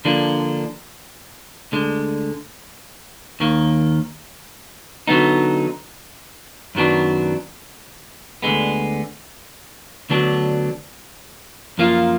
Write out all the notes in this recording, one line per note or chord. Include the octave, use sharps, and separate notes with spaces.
D3 F3 A#3 D4
D2 D3 G#3
D#2 D#3 A#3
D3 F#3 B3 D#4
F#2 D#3 F#3 B3 D4
D2 D3 G#3 B3
D2 D3 F#3 B3 D4
F#2 F3 A#3 F4